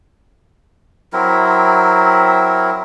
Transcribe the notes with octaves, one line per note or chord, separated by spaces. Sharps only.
F#3 C4 E4 A#4